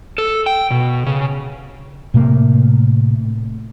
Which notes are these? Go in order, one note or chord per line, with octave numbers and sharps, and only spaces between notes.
A4
G5
B2
C#3
A2 C3 A3 A#3